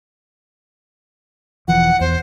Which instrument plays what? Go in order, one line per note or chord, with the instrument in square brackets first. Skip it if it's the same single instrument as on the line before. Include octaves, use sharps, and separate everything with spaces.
[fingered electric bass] E1 E3 F3 [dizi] F#5
[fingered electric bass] E2 [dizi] C5